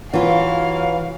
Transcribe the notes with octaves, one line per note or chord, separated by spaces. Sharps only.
E3 F#3 F4 F5